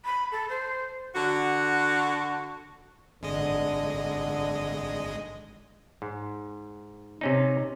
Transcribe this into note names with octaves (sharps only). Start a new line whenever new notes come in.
B5
A4
C5
D3 F#4
G#1 D3 G#3 D#5
G#2
C3 C#4 D#4